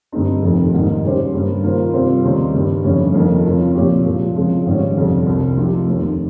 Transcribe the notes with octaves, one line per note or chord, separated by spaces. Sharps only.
G1 G2 G3 C4 D#4
F1 F2 C3 D#3
G#1 G#2 G3 A#3 D#4
C#3 G3 C#4 G4 C5
G2 G3 A#3
D#3 A#3 F4 C5
C3 G3 C4 F4 C5
D#2 C#3 G3 C4 D#4
G2 D#3 G3
G1 F2 C#3 G3 C#4
F2 D#3 A#3 D#4
C#3 F3 C4
A#2 F3 C4 G4 C#5
A#2 F3 G#3
C#3 F3 G#3 C4
G#1 G#2 G3 C#4
G1 F2 C3 G3
C2 C3 G3
C3 F3 C4 D#4 G4
F1 D#2 D#3